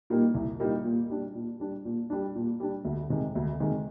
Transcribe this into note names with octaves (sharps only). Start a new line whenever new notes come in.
A#2 G3 A#3 D#4
C2
A#2 G3 A#3 D#4
A#2
G3 D4
A#2
G3 D4
A#2
G3 D4
A#2
G3 D4
D2
C3 D#3 G#3
D2
C3 D#3 G#3